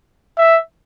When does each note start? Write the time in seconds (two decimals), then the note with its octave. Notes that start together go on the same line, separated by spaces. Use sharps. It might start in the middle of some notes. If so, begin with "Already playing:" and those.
0.38 E5